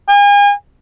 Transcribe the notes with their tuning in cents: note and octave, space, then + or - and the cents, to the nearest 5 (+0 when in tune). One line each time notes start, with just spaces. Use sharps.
G#5 -40